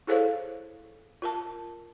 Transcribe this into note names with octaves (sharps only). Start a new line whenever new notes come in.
E4 G#4 A4 C5 C#5 F5
F4 A#4 A5